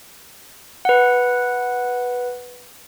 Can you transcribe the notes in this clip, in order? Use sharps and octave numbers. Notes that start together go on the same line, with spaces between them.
B4 F#5